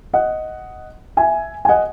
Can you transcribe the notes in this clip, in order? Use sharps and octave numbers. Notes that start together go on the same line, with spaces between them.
D#5 F#5
E5 G#5
G#5
D#5 F#5